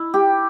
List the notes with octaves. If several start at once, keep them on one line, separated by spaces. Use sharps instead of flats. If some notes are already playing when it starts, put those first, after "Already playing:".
Already playing: E4
G4